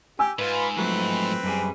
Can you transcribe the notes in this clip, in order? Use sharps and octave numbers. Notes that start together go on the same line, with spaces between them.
G4 G#5 E6
G#2 F4 B4 B5
F3 F#3 A3 C4 B4
F#2 G3 G#4